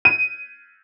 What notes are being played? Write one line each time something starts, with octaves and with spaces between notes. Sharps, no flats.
D#7